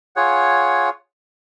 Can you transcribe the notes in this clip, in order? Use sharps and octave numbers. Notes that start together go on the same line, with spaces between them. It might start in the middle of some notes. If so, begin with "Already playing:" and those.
F4 G#4 C#5 F#5